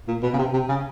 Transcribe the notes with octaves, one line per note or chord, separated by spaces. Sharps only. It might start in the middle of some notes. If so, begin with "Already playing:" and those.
A#2
B2
C#3
C3
C3
C#3